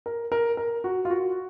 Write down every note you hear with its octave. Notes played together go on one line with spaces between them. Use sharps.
A#4
A#4
A#4
F#4
F4
F#4